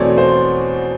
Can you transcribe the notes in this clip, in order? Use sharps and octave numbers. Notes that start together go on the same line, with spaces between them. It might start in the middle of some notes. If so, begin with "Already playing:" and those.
Already playing: E2 B2 F#3 A3 C4 C#5 D5
C5